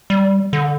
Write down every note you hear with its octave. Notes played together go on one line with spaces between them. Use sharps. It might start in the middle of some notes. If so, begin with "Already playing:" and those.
G3
D3